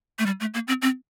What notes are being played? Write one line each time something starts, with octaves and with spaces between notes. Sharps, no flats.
A3
G3
A3
A#3
C4
C4